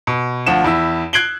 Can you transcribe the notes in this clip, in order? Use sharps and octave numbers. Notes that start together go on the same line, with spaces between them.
B2
D2 F3 F#5 E7
E2 E4 E6
F#6 G#6 C7 D7 F#7 G7